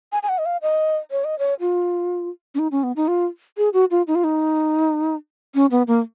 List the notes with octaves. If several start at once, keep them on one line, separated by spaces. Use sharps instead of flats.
G#5
G#5
F#5
D#5
F5
D#5
C#5
D#5
C#5
F4
C#4
D#4
C#4
B3
D#4
F4
G#4
F#4
F4
D#4
F4
D#4
C#4
B3
A#3